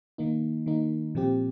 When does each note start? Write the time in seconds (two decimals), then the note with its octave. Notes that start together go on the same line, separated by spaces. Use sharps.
0.18 D#3 A#3 D#4
0.66 D#3 A#3 D#4
1.15 A#2 F3 C4 G4